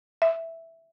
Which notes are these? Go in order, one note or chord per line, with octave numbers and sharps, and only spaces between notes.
E5